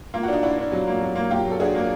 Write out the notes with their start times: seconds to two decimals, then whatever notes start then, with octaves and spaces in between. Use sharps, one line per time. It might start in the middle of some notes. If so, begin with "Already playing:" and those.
0.14 A#3 F4
0.23 F#4
0.28 D4 D#4 F4
0.43 D4 E4 F#4
0.58 D4
0.72 F#3
0.87 A#3
1.01 F#3
1.15 A#3
1.31 A#3 F4 G4
1.45 F#3
1.51 A4
1.60 D4 F#4 G#4
1.74 A#3 A#4